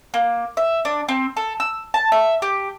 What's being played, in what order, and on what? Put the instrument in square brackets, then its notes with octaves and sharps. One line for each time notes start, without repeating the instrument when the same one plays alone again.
[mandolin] A#3
E5
D4
C4
A4
E6
A5
E5
G4